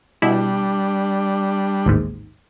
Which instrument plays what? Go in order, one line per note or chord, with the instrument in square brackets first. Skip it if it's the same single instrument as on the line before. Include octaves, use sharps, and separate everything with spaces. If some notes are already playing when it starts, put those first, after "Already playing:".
[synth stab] B2 E4 [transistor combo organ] G3 D4
[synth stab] A1 D#2 G#2